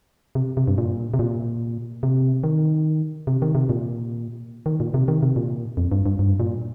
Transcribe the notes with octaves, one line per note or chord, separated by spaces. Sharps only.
C3
C3
G2
A#2
C3
A#2
C3
D#3
C3
D#3
C3
A#2
D#3
A#2
C3
D#3
C3
A#2
F2
G2
G2
G2
A#2